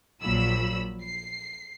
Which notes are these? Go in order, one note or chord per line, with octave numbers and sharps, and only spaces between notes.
A#1 A#2 F3 F#3 B5 E6
C7